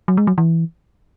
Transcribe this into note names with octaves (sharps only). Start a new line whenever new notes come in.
F#3
G#3
F#3
E3